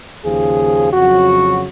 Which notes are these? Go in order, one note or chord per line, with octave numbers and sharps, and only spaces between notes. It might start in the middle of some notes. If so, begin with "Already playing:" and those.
D#2 C#3 F3 G#4
F2 C#3 F#3 F#4